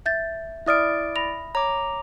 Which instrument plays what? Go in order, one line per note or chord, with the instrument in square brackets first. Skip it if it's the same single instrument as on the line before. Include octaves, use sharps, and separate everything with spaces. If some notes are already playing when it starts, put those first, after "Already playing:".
[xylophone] E5 G6 A6
[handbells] E4 D5 D7 [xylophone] E5 D#6 F6
[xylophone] B5 A#6 F7
[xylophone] C#5 [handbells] A#5 D6